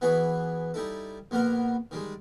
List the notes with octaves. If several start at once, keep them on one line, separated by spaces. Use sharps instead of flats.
E3 B3 F#4 G#4 B4
G3 D#4 E4 A4
A#1 A#3 B3 A#4 F#5
D#3 G3 G#3